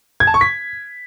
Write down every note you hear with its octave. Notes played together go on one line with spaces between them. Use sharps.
G#6
A5
C#6
B6